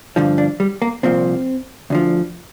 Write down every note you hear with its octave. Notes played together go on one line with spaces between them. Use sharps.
G2 D3 F3
D4
G3
A#3
C2 A#2 F3 C4
D2 D3 F3